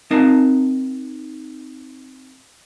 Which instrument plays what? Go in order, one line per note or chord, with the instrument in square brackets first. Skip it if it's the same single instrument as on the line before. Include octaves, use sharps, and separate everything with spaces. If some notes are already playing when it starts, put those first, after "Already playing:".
[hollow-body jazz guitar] C4 D#4 A#4 F5 A5 A#5